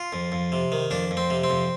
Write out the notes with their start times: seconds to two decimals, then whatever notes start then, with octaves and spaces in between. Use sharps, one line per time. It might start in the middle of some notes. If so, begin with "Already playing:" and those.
Already playing: F4
0.13 F2
0.32 F2
0.52 C3
0.72 D#3
0.91 F2 D4
1.11 F2
1.17 C4
1.30 C3
1.44 C4
1.50 F2